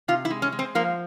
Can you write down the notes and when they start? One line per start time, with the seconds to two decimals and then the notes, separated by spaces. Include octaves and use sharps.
0.08 C3 F4
0.25 E4
0.30 G#3
0.42 C#4
0.52 G#3
0.59 C4
0.75 F3 A#3